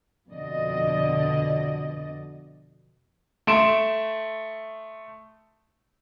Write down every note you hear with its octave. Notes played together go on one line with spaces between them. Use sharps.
F2 B2 D3 D5 D#5
A3 C6 D7 E7